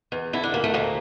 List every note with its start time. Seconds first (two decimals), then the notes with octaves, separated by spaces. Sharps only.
0.12 E2
0.33 D3 E4
0.44 D4
0.54 D2 A#3
0.64 A3
0.74 D2 A#3